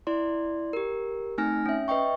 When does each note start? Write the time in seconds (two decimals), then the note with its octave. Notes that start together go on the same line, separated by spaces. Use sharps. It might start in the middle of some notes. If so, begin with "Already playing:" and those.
0.07 E4 D5 C6
0.73 G4 A#4
1.38 A3 C4 D#4 G#5 F6 A#6
1.66 C#4 E5
1.88 B4 D#5 E5 G5 C#6